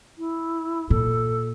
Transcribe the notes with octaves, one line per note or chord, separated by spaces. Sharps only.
E4
A#2 A4